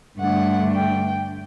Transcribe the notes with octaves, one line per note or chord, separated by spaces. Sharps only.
G2 D3 A3 D4 F#5
G5